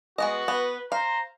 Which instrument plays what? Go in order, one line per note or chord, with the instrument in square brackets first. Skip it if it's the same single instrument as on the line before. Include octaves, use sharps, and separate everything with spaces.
[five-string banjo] G#3 B3 D#5 [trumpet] F#4
[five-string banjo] B3 [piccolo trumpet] B4
[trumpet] C5 [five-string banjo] F5 [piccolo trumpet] A#5